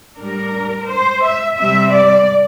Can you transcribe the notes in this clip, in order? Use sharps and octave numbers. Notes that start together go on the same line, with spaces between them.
A2 G3 D4 A#4
C5
E5
C3 G3 C4 E5
D5